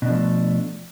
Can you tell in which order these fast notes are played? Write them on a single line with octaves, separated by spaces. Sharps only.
B2 D4 F3 A3